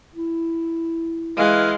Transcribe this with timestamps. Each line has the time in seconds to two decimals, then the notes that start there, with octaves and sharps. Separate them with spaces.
0.15 E4
1.37 E3 G#3 F5